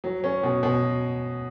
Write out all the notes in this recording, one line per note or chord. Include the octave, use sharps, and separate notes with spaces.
F#3
C#4
B2
B2